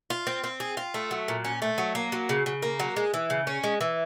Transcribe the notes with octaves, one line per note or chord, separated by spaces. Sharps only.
F4
C4
C4
G#4
F4
A3
F#3
A#2
C#4
A3
F#3
A#3
F#3
C#3
C#3
A#3
F#3
G#3
E3
C#3
C#4
G#3
E3